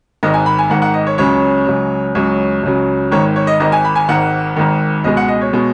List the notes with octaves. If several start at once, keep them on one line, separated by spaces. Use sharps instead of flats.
G#1 G#2 D#3 D#5
G#5
B5
G#5
G#1 G#2 D#3 F#5
F#5
D#5
C#5
C#2 C#3 F#3 C#5
C#2 C#3 F#3
C#2 C#3 F#3 C#5
C#2 C#3 F#3
G#1 G#2 D#3 C#5
C#5
D#5
G#1 G#2 D#3 D#5
G#5
B5
G#5
G#1 G#2 D#3 F#5
G#1 G#2 D#3
C#2 B2 G#3 D#5
F#5
D#5
C#5
B2 G#3